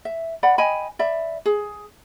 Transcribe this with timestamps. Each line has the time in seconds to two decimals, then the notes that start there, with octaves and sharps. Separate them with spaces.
0.05 E5
0.43 D5 F#5 B5
0.58 D#5 G5 G#5 B5
0.99 D5 E5 B5
1.46 G#4